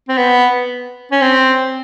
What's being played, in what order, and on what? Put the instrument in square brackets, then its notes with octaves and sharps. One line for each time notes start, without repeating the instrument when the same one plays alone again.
[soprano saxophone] C4
B3
C#4
C4